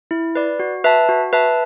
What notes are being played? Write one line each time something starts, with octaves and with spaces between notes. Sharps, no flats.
E4
B4 D5
F#4
B4 E5 A5
F#4
B4 E5 A5